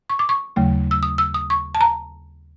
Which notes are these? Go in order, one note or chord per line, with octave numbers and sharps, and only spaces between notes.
C#6
D6
C#6
D#2 C#3 F#3 A3
E6
D#6
E6
D#6
C#6
A5
A#5